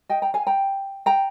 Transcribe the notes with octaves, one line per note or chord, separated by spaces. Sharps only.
D#5 G5
G5 A#5
F5 G#5
G5 A#5
G5 A#5